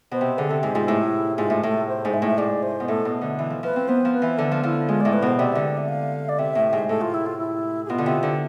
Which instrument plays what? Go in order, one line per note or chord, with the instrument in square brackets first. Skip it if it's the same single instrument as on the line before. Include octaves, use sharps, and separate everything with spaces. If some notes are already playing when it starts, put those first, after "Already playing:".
[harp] B2 [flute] C5
[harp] C3
[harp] D3 [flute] G#4
[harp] C3 [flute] A4
[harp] G#2 [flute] G#4
[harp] G#2 [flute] F4
[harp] A2 [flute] E4
[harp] G#2 [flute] F4
[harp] A2
[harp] A2 [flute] A4
[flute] C5
[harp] G#2
[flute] E5
[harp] A2
[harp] G#2 [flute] D5
[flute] C5
[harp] B2
[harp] A2 [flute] A4
[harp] B2
D3
E3
F3
[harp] F3 [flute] B4
[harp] C4
[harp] B3 [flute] C5
[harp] F3
[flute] B4
[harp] E3
[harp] D3 [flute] A4
[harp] F3
[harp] F3 [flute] E4
[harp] G#3 [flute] F4
[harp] A2 [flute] D5
[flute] B4
[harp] B2 [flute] C5
[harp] C3 [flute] D5
[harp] D3
[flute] E5
F5
D5
[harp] C3 [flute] E5
[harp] A2
G#2
[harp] A2 [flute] A4
[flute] F4
E4
F4
E4
G#4
[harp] B2 [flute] F4
[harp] D3
C3
D3